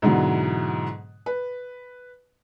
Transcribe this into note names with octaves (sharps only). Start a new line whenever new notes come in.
G#2 B2 D3 E3 F#3
B4